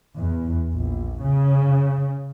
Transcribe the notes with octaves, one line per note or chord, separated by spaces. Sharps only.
E2
A#1
C#3